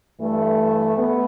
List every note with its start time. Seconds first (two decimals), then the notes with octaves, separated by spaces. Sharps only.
0.20 G2 E3 A3
0.97 A3 B3